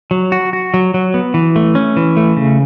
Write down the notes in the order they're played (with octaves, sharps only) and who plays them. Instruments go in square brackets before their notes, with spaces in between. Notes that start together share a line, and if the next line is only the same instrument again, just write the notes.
[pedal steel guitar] F#3
F#4
F#4
F#3
F#3
B3
E3
A3
C#4
E3
A3
C#3